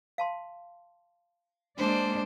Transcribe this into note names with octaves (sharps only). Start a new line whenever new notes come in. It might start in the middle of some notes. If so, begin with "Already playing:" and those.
F5 A5 C6
G#3 A#3 D4 C5 D5